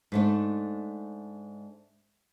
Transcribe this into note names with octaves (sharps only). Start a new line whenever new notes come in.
G#2 A3 D4